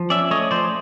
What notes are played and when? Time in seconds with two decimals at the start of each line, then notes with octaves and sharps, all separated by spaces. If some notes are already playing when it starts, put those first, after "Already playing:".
Already playing: F3
0.10 C#4 D5 E5
0.31 A3 C#5 D#5
0.51 F3 C5 D5